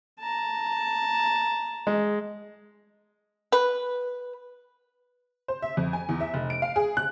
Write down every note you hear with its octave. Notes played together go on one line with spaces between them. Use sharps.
A5 A#5
G#3
B4
C5
E5
F2
G#5
E2
E5
F1
D7
F5
G#4
F#6